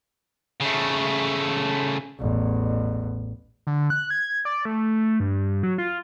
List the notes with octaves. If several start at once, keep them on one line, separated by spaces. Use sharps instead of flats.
C#3 A3
A1 E2
D3
F#6
G#6
D5
A3
G2
F#3
F4